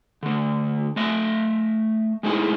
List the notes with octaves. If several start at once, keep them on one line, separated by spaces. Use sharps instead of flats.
D3 A3
A3 D#5 E5
G#3 A3 D#4 E4 G#4